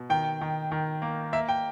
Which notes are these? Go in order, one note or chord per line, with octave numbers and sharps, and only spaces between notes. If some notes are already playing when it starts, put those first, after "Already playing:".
Already playing: B2
D#3 G5
D#3
D#3
A#3
A#3 E5
G5